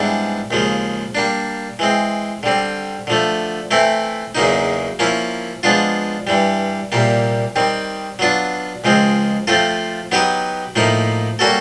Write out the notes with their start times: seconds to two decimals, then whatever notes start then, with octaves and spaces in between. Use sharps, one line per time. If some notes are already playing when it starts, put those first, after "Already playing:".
Already playing: G#2 E3 G3 B3 D4
0.51 D#2 C#3 F3 G#3
1.15 G3 A#3 D4
1.79 E3 G#3 C4
2.43 D3 G3 C4
3.07 D3 F3 A3
3.71 E3 A3 C4 E4
4.35 E2 C#3 F#3 A#3 D#4
4.99 F3 A#3 C#4 E4
5.63 F3 G#3 B3 D4 F4
6.27 G2 E3 G3
6.92 C2 A#2 G3 A#3
7.56 D#3 G3 C4
8.19 F#3 B3 D4 F4
8.84 C#2 C#3 F3 G#3 C4
9.47 F3 A3 C4 F4 A4
10.12 F#3 B3 D#4 G4 B4
10.76 A2 F3 A#3 D#4
11.39 G3 A#3 C#4 F#4 A4